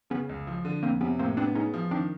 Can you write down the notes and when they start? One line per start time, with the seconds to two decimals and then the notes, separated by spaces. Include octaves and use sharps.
0.10 C#3 B3 C#4
0.29 C#2
0.47 F3
0.65 D3
0.83 F2 A#3 C4
1.01 C3 B3 C#4
1.19 A2 A#3 C4
1.37 B3 C4 D4
1.55 G#3 C#4 D#4
1.74 F3
1.91 D#3 C4 D4